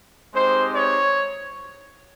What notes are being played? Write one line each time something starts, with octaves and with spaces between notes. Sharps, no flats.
G#3 C4 D#4 G4 C5
C#5